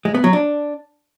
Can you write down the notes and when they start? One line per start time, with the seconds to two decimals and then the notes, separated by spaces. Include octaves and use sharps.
0.05 G#3
0.14 B3
0.24 F#3
0.33 D4